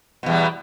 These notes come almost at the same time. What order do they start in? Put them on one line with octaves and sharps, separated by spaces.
B2 E2 G3